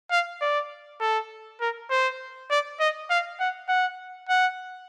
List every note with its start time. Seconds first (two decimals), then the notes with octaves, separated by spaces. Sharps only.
0.11 F5
0.41 D5
1.00 A4
1.61 A#4
1.90 C5
2.50 D5
2.80 D#5
3.10 F5
3.40 F#5
3.69 F#5
4.29 F#5